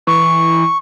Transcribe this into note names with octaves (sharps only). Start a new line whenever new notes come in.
E3 C#6